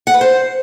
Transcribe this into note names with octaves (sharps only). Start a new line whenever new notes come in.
F#5
B4
C5